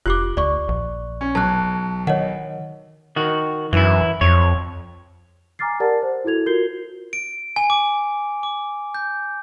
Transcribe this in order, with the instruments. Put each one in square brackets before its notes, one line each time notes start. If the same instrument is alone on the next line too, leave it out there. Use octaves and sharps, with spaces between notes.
[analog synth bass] F1 [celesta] F4 G4 D6 [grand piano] F#6
[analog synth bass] D2 [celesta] D5 C#6
[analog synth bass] A#1
[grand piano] C#4
[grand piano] B1 [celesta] A5 F#6
[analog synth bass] D#3 [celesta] C#5 D#5 F#5
[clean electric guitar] D#3 F#4
[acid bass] F#2 [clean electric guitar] E3 E4
[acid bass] F2 [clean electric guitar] C#5
[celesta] G#5 A#5 D6 F6 A6 C7
G4 A#4 D5 F#5 A5 A6
C5
E4 F#4 A4 G#6 F7
F4 F#4 A#4 G6 C7 G7
[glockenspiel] D7
G#5
D6
D6
G6